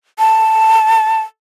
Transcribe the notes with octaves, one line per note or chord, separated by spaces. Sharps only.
A5